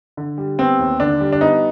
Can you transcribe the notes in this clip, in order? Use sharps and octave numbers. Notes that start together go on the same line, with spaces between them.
D3
G3
B3 C4
D#2
D3 D4
G3
D4
B3 D#4